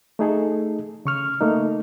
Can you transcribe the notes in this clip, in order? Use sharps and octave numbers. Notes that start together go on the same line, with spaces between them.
A3 D#4 G#4 A4
C#3 C#6 F6
A3 A#3 D#4